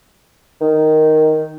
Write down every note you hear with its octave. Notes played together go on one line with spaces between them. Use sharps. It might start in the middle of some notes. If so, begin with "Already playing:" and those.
D#3